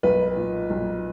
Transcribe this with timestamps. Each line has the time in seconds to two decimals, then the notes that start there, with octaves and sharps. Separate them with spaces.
0.03 B1 B4
0.36 A#2
0.70 B1